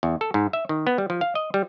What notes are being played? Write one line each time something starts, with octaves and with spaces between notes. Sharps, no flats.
E2
A4
G#2
E5
D#3
B3
G3
F3
F5
D#5
G3